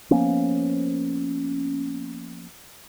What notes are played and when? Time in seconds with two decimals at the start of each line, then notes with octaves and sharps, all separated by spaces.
0.11 F3 A#3 B3 C#4